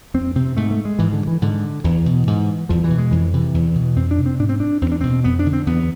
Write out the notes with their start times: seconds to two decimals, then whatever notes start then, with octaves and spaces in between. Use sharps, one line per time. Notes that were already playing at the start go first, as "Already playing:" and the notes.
0.14 F2 C4
0.36 C3 C4
0.57 G#2 A3
0.71 A3
0.85 G#3
0.99 G#2 E3
1.13 D3
1.27 E3
1.42 G#2 D3
1.84 E2 E3
2.06 B2
2.27 G#2
2.69 E2 F3
2.84 E3
2.90 B2
2.98 G#3
3.11 F2 E3
3.34 C3 E3
3.54 E2
3.75 B2
3.96 F2 C4
4.11 D4
4.18 C3
4.26 C4
4.40 G#2 D4
4.49 C4
4.60 D4
4.81 E2 C4
4.92 D4
5.01 B2 C4
5.24 F2 B3
5.39 D4
5.46 D3
5.53 C4
5.67 E2 B3